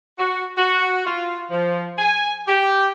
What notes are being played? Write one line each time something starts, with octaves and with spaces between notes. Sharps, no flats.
F#4
F#4
F4
F3
G#5
G4